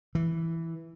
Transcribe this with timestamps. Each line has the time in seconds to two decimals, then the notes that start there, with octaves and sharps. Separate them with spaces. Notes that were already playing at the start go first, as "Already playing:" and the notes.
0.15 E3